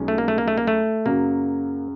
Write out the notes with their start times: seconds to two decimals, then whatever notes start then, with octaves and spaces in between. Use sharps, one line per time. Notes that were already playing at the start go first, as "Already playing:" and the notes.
Already playing: B1 B2 G#3 C#4
0.08 A3
0.18 A#3
0.28 A3
0.38 A#3
0.48 A3
0.58 A#3
0.67 A3
1.06 F#2 C#3 F#3 A#3